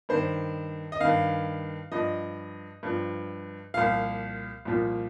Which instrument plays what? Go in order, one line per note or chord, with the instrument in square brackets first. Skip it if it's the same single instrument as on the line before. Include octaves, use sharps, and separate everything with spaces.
[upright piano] G2 D#3 C5
D#5
G2 D#3 F5
G2 F3 D#5
G2 F3
C2 A#2 F3 F5
C2 A#2 F3